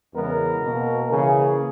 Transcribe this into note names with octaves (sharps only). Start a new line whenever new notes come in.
E2 C#3 E3 G#3 B3 A#4
B2 A#3
C#3 E3 A#3 G#4